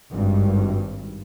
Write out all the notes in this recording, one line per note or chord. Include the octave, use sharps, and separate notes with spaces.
G#1 G2